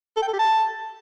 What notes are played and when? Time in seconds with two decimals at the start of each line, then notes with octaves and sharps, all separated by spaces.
0.17 A4
0.22 G5
0.28 A4
0.33 G4
0.39 A5